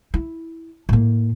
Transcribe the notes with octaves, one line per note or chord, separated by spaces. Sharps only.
E4
A2 A#3